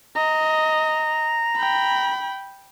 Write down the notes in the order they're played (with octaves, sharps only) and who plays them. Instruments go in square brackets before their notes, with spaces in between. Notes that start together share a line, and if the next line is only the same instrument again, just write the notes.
[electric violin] D#5 [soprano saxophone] A#5
[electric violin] G5 B5